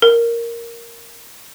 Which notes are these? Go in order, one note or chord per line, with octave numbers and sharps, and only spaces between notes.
A#4